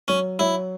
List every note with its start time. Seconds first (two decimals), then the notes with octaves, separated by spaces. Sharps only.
0.08 F#3 C#4
0.39 F#3 E4